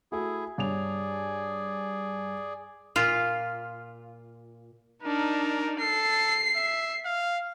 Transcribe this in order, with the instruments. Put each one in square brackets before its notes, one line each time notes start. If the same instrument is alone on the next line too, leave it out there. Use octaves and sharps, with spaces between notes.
[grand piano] A3 F#4 [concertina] E4 G#4
[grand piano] G2 C#5 F7 [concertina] G#4 D5
[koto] A#2 F4
[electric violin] D4 D#4 [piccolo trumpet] A#4
[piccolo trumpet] A4 [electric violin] C7
[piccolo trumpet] E5
F5